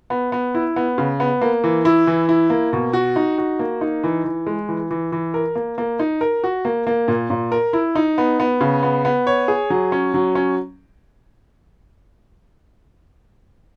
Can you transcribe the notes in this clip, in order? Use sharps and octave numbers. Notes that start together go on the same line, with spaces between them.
B3
B3
E4
B3
C#3
B3
A#3
E3
E4
E3
E4
A#3
B2
F#4
D#4
F#4
A#3
D#4
E3
E3
G#3
E3
E3
E3
A#4
A#3
A#3
D#4
A#4
F#4
A#3
A#3
A#2
A#2
A#4
E4
D#4
B3
B3
C#3
B3
B3
C#5
G#4
F#3
C#4
F#3
C#4